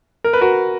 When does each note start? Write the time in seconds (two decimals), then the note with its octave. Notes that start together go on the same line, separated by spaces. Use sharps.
0.24 A#4
0.33 B4
0.41 F#4 A#4